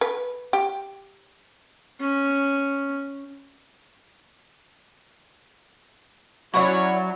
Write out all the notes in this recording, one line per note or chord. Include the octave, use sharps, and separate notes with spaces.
B4
G4
C#4
F#3 C#4 E4 C#5 D5 F#5 B5 C#6